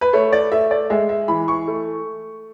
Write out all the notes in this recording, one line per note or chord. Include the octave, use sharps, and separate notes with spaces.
B4
A3 C#5
D5
A3 E5
D5
G#3 E5
E5
E3 B5
C#6
A3